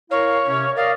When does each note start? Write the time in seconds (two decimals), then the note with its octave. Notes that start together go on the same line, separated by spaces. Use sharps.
0.11 E4 A#4 C#5 F5
0.46 C3 C#4
0.76 A#4 D5 D#5 F5